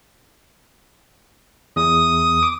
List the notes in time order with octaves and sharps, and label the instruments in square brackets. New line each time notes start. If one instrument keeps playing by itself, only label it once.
[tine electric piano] E2 [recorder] D#6
[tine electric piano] D6